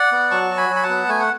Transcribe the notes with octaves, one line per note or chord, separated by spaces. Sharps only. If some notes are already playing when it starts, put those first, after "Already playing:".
Already playing: D5 F#5
B3
F#3 A5 C#6
F#4
G#5 B5
F#3
B5
F#5 A5
B3
A3 G#5
F#5